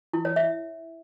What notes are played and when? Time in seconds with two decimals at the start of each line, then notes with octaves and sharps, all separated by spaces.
0.13 E4
0.25 C#5
0.36 E5